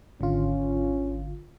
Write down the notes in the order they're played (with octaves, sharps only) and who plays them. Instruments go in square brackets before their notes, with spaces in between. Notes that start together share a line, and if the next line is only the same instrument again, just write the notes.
[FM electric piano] G#1 D3 F4 [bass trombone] C#4